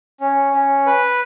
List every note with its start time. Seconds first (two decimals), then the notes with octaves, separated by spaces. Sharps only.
0.21 C#4
0.53 C#4
0.86 B4